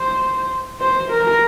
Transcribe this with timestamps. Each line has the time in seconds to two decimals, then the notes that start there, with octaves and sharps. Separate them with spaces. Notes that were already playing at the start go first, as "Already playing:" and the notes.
Already playing: C5
0.80 C5
1.11 A#4